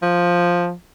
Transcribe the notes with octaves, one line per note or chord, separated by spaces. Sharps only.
F3